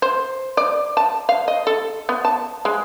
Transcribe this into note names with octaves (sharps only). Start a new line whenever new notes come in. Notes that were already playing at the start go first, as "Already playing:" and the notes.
C5
D5
A5
F5
D#5
A4
B3
A5
G#3